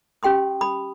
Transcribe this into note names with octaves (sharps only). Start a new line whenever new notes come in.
C#4 G4 G5 C6 D#6
B5 D#6